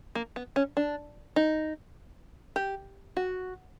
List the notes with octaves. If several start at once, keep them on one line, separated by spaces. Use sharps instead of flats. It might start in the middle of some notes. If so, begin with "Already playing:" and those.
A#3
B3
C#4
D4
D#4
G4
F#4